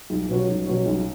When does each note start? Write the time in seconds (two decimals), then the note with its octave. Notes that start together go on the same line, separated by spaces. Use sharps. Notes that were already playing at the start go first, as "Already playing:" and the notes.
0.10 B1
0.29 B2 F#3 C#4 F#4
0.49 B1
0.67 B2 F#3 C#4 F#4
0.86 B1